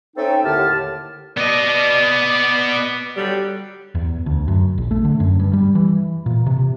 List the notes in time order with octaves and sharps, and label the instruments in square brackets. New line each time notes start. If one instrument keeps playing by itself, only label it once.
[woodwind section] C4 C#4 D#4 A4 E5 G5
D#2 A2 D3 G4 A5 F6
[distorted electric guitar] B3 D#5 [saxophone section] D5
[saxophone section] D3 F#3 G3
[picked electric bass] E2
D2
F#2
A#1
A3
D3
F#2
G2
G3
E3
A#2
C3